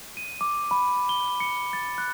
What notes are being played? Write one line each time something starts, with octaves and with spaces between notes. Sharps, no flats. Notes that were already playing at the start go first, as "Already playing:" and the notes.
D#7
D6
B5
G7
C#7
A6
F#6